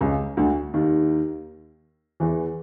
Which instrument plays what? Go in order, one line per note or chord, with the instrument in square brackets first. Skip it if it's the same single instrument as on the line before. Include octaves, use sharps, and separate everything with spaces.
[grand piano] C#2 C#3
D2 D3
D#2 D#3
E2 E3